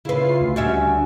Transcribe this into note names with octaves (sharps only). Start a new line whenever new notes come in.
C#3 E4 F4 B4 C7
D2 F#4
G3 C#4 E5